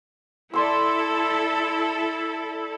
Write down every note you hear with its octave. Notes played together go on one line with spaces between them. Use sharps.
E4 A4 D5 C6 E6